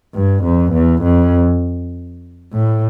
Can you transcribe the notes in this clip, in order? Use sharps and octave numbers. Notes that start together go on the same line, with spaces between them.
G2
F2
E2
F2
A2